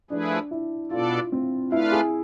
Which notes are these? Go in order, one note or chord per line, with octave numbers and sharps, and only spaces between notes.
F3 A3 D4 E4 G#4 B4
E4
B2 B3 D4 F4 A4 D5
C4
A3 D4 E4 F4 B4 F5
G#4